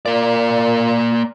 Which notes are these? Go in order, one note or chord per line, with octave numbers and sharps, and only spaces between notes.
A#2 A#3 D5